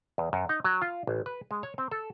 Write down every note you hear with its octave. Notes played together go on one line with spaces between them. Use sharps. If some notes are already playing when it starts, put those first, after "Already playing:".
E2
F#2
D#4
F#3
F4
A1
B4
G#3
C#5
C4
A4